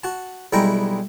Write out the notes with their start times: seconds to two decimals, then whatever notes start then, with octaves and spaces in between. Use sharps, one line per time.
0.04 F#4 A5
0.53 B1 G3 G#3 E4 G5 A#5